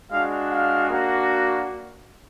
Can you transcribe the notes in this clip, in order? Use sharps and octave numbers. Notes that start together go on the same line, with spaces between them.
G#3 D4 F#4 F5
F5
A#3 D4 F#4